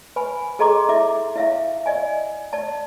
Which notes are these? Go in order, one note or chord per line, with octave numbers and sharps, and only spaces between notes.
B4 G#5 B5
G#4 A4 D#5 A#5 C6 D6
E4 E5 D6
E4 E5 F5
D5 D#5 G#5
D5 A5